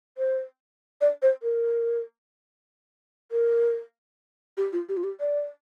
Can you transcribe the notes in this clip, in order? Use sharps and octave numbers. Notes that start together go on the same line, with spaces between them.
C5
D5
C5
A#4
A#4
G4
F4
G4
F4
G4
D5